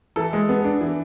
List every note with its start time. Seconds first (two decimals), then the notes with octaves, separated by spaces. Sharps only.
0.16 E3 A4
0.33 G#3
0.49 B3
0.64 D4
0.81 E3